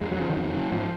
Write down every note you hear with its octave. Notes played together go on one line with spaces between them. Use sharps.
F2 G#3
F#3
C#3 F3
D#3 F#3
F2
C#3
G#2 F3